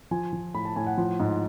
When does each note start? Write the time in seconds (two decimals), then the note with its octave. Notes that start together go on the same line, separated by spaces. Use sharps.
0.11 F3 G#5
0.33 F3
0.54 A2 B5
0.65 A5
0.76 A2 G#5
0.87 F#5
0.98 F3
1.20 G#2